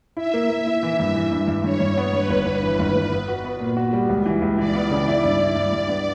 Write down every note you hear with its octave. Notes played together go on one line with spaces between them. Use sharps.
E4 E5
A#3
A#3
E4
E3
G2
E3
G2
G2
G2 C#5
G2
B3
G2 B4
G1
G1
E3
G1
G1
B3
F#4
B3
A#2
F#4
G3
C#2
E3
C#2
E3 D5
B3
C#3
E4
G2
E4
G2
G2
B3